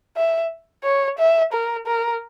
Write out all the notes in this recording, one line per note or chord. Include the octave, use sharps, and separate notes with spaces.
E5
C#5
E5
A#4
A#4